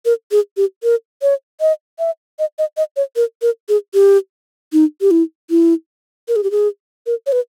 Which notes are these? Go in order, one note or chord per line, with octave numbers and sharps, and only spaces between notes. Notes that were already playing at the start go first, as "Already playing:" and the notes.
A#4
G#4
G4
A#4
C#5
D#5
E5
D#5
D#5
D#5
C#5
A#4
A#4
G#4
G4
D#4
G4
E4
E4
A#4
G#4
G4
G#4
A#4
C#5
B4